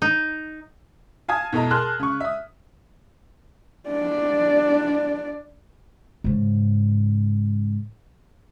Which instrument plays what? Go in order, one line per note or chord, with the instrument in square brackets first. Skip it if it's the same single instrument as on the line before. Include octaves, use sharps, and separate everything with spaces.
[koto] D#4
[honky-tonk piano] F5 G#5 A5 D#6 G#6
E2 B2 A4 D#5 A#5
G#4 A#4 A5 C6 F6 F#6
C#3 C#6
E5 D#6
[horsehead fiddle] D4 D5
[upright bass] G#2 C#3